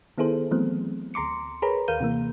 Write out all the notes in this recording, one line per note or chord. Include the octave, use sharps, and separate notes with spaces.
D#3 B3 E4 G#4 A4 C5
E3 F#3 A3 B3 C4
D2 A#5 C6 D6 C#7
G#4 A#4 B4 C#5 A#5 B5
D#2 A#4 F5 G6 D#7
C3 E3 A#3